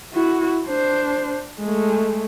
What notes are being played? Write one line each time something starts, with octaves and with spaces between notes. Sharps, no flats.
E4 F#4
D4 C5
G#3 A3